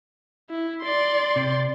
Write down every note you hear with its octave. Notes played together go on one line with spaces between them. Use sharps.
E4
D5 C6
C3